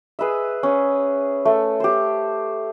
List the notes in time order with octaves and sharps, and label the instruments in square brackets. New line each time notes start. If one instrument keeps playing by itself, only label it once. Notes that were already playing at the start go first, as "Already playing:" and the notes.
[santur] G#4 B4 D#5 E5
C#4
A3
G4 C5